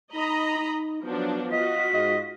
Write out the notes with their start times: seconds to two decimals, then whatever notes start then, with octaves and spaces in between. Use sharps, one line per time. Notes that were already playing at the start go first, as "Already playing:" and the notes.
0.14 D#4 D#5 A#5 B5
0.59 D#4
1.03 F3 F#3 B3 D4
1.52 F4 F#4 D#5 B6
1.93 G#2 D#5